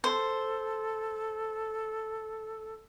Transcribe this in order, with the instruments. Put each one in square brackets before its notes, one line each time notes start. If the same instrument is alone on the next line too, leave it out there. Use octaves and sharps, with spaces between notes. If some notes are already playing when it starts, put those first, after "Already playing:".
[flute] A4 [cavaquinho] C5